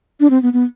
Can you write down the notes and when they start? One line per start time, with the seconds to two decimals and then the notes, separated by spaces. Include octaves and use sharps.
0.20 D4
0.30 C4
0.42 B3
0.53 B3